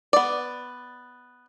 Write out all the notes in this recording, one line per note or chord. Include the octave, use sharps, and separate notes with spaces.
B3 D5